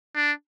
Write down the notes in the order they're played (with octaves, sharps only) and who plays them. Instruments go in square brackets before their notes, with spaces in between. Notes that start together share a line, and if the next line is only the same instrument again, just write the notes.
[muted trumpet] D4